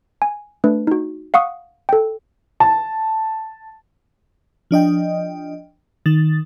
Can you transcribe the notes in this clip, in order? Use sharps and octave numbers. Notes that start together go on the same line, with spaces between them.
G#5
A3 D4 B4
D#4 F#4
F5 F#5 C#6 D#6
A4 G5
A5
F3 D4 D#5 G5
D#3 A6